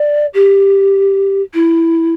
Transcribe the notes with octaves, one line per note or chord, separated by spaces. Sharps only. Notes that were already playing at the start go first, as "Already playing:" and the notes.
Already playing: D5
G4
E4